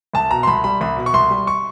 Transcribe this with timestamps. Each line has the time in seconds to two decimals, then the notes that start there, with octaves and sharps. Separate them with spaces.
0.14 C2 A5
0.31 B2 A#5
0.43 C6
0.47 C2 B5
0.64 G3 B5
0.81 C2 B5
0.97 B2
1.06 C#6
1.14 C2 C6
1.30 G3
1.47 C#6